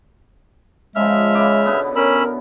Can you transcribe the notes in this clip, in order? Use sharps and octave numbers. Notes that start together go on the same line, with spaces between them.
C#3 F3 G#3 E5 F6
C#3 E4 D6
B2 D3 B3
C#4 A#4 B5 E6